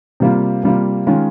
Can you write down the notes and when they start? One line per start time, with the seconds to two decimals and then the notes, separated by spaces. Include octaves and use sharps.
0.20 C3 G3 A#3 F4
0.64 C3 G3 A#3 F4
1.07 D#3 G#3 C#4 F4